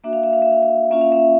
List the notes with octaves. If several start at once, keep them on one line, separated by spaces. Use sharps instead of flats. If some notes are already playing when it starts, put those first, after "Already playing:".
A#3 D4 F#4 E5
F5
E5
F5
E5
F5
E5
A#3 C#4 F4 E5
F5
E5